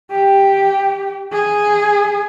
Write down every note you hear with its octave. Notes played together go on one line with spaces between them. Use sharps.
G4
G#4